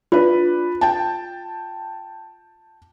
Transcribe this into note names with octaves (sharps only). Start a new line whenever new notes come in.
D4 F4 B4
G5 A5